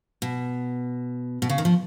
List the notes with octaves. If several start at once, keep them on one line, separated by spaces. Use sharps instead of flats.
B2
B2
C#3
D#3
F3